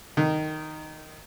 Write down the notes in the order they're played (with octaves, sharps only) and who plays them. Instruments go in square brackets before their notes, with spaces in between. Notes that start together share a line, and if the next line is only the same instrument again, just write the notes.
[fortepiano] D#3